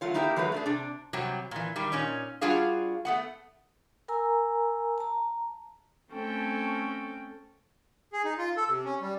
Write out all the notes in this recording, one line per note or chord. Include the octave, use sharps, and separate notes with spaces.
F#3 A3 F4 C#5
A#3 D#4 E4 G4 E5 G5
E3 F#3 G#3 A#3 B4
A3 D4 G#4
C3 D4
C3 F#3 G3
A#2 E3
D#3 G3
A#2 C#4 D#4
G3 D4 F4 F#4 G#4 F5
A3 B3 F#5
A#4 G#5 A#5 E6
A5 A#5
A3 C4 C#4 A4 G5
G#4
D#4
F4
A4
C3
C#4
G3